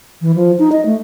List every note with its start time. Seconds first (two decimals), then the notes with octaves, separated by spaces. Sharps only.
0.21 E3
0.36 F3
0.59 D#4
0.72 D#5
0.86 A3